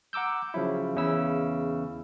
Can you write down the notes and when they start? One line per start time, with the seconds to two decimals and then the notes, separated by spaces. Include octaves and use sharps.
0.13 F#5 A#5 D6 E6 G6
0.54 C#3 F3 F#3 E4
0.95 E2 C#3 E4 E6